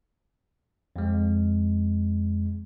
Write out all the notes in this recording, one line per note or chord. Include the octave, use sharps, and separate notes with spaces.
F2 G#3